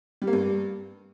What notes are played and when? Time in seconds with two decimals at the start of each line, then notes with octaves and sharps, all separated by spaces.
0.22 G3
0.27 A#3
0.33 G2